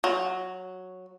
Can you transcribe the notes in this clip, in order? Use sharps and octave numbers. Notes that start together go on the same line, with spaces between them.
F#3